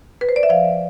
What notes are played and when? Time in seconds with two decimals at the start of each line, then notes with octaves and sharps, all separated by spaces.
0.21 B4
0.29 C5
0.36 D5
0.43 E5
0.49 F3 F5